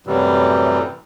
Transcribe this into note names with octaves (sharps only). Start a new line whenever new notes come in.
F#2 A2 C3 E3 F#3 G3